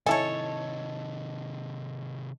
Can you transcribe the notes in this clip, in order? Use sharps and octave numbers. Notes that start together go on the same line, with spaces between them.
C3 D#3 E4 A4 C#5 D#5 G#5 A5